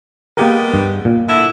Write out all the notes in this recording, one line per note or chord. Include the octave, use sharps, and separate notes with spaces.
G3 G#3 A#3 B3 G4 A#4
G2
A#2
D3 E4